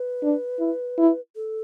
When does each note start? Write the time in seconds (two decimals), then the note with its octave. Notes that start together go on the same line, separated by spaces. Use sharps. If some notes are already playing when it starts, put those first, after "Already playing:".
Already playing: B4
0.23 D4
0.59 E4
0.98 E4
1.36 A4